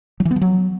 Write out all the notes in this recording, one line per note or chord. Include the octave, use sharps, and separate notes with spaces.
F#3
E3
B3
F3
F#3